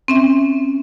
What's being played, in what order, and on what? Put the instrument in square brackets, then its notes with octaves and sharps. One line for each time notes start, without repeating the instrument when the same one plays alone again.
[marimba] C4 C#4 E5